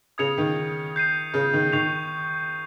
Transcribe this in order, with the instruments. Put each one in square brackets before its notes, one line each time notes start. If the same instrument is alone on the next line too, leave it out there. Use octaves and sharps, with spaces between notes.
[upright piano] C#3 [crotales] D#6 G#6 C#7 F7
[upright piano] D#3
[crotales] G6 C7 D#7
[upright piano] C#3
D#3
[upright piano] D#3 [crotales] C#6 G6 C7 F7